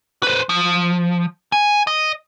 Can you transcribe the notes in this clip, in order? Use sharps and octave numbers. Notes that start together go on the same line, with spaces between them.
B4 C5
F3
G#5
D#5